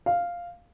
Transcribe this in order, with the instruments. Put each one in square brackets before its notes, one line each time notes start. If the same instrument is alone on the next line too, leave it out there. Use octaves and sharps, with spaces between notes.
[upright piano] F5